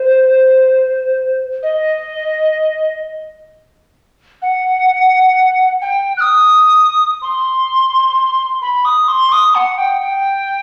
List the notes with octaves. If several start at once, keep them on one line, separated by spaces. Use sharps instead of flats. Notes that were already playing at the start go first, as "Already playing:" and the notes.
Already playing: C5
D#5
F#5
G5
F#6
D#6
C6
B5
D#6
C6
D#6
F#5
G5
G5